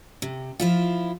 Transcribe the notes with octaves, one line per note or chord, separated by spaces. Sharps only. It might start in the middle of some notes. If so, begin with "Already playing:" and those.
C3
F3 E4 F4